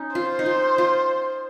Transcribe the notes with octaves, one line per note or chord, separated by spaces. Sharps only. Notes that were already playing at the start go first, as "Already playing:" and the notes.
Already playing: C#4 D#4
F4 C5
D#4
F4
F4